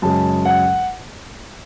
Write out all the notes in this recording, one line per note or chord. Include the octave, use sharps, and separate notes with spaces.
F#2 C#3 G#3 A5
F#5